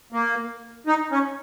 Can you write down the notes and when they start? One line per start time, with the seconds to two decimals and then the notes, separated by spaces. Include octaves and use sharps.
0.12 A#3
0.87 D#4
1.11 C#4